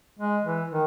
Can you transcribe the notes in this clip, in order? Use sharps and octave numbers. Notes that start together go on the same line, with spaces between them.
G#3
E3
D#3